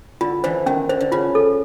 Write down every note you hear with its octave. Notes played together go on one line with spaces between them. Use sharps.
D3 F4
D3 E3 C5
D#3 C#4
D3 C5
D3
C#3 F4
A4